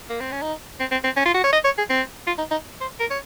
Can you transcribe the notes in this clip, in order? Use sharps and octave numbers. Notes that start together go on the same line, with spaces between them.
A#3
C4
C#4
D#4
C4
C4
C4
C#4
F4
F#4
C#5
D#5
C#5
G#4
C4
F4
D#4
D#4
C5
A#4
C#5